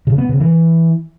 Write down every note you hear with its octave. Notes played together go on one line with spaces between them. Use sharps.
C#3
B3
C#3
E3